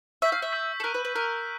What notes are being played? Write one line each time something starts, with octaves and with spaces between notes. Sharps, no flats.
E5 C#6 E6 G6 B6
F5
E5
C#6 E6 G6 B6
A4
A#4 F#6 B6 D#7
B4
B4
A#4 F#6 B6 D#7